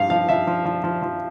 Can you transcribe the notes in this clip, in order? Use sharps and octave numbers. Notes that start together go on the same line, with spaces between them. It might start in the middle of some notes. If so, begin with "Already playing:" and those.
Already playing: G2 F3 F5
F3 F5
F3 E5
F3
F3
F3
F3